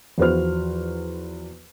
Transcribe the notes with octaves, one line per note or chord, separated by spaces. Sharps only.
E2 F3 F#4 B4 C5 F6